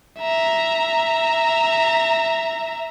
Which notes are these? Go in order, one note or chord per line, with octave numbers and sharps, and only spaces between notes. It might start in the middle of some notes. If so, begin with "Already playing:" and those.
E5 A#5